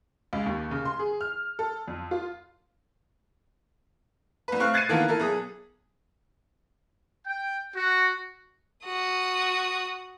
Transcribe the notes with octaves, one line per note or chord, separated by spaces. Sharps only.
C#2
D#2
C#3
C6
G#4
F6
A4
F2
F4
C2 B4
A3 C4 F5 C#6 F#6
F#6 G#6 A6 C7 C#7 D#7
D#3 E3 A#3 B3 F4 A4
E4 A4 A#4
B1 G#4 D#6
G5
F#4
F#4 D#6